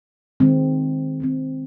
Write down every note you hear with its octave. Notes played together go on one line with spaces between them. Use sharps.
D#3 G#3 C4
D#3 G#3 C4